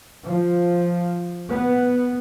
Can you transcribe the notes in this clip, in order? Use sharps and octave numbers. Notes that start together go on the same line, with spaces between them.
F3
B3